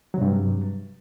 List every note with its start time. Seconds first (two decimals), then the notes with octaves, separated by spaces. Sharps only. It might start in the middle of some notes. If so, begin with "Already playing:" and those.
0.14 F#3
0.18 C3
0.21 G2